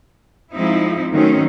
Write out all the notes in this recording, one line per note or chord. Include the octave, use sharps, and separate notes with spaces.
F3 G#3 C4 D#4 E4
D#3 F#3 A3 C4 C#4 D#4